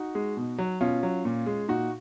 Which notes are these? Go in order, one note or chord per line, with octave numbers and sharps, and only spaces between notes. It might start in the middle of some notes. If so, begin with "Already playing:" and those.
Already playing: D#4 F#4
G#3
B2
F#3
B2 C#4 F4
F#3
A#2
G#3
A#2 D#4 F#4